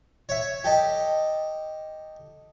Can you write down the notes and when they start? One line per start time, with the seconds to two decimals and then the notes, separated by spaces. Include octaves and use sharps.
0.29 C#5 E5
0.64 G4 A4 D#5